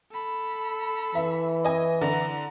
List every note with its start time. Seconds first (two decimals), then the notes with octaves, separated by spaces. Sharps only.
0.12 A4 B5
1.15 E3 E5
1.65 D#5 G#5
2.01 D3 A#5